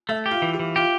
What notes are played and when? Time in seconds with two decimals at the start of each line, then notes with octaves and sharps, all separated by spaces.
0.09 A3 E5
0.26 G4
0.31 F4
0.42 E3
0.53 G4
0.60 E3
0.76 F4 G4